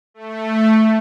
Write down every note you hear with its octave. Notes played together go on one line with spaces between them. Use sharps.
A3